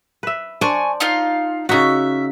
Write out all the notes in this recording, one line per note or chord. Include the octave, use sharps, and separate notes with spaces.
B4 E5
D4 C5 D5 G#5 C#6
D#4 F4 F5
C#3 C#4 D#4 F#4 E5